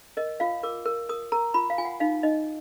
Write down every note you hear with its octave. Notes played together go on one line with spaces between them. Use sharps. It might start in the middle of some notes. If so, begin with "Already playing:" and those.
A#4 D#5
F4 F5
A#4 D6
A#4
A#4 D#6
A#4 A#5
F4 B5
F5
F4 G#5
F#5
D#4 F5
D#4 D#5